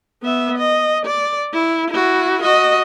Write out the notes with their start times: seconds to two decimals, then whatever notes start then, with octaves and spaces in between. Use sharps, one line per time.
0.23 B3 E5
0.58 D#5
1.06 D5
1.54 E4
1.90 E4 F#4
2.42 F#4 D#5